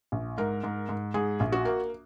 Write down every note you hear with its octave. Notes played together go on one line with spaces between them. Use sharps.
A#1
G#2 A#4
G#2
G#2
G#2 G#4
A#1
F#4
A#3